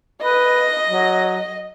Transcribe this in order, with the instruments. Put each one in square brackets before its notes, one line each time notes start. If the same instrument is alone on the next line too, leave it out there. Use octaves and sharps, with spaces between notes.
[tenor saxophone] B4 [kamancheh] D#5
[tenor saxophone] F#3